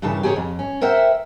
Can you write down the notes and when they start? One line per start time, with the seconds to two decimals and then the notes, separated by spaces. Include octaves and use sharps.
0.02 G2 A#2 C#3 E3 A5
0.23 G4 G#4 A#4 B4 C#5
0.36 F2
0.59 C#4
0.82 A#4 C5 E5 F#5 G5